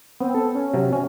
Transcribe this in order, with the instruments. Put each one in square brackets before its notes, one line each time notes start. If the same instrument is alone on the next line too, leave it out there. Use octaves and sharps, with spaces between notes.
[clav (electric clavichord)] B3 [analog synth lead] C4
[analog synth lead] A4
C#4
[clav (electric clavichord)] C3 F#3
C#4